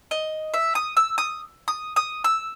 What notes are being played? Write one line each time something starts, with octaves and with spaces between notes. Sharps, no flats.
D#5
E5
D#6
E6
D#6
D#6
D#6
E6